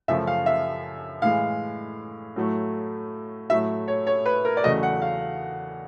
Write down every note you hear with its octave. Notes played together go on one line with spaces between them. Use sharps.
F#2 C#3 F3 A3 E5
F5
E5
A2 E3 G#3 F5
A2 F#3 A3
A2 F#3 A3 E5
C#5
C#5
B4
A#4
D5
E2 C#3 F#3 A3 D#5
F#5
F5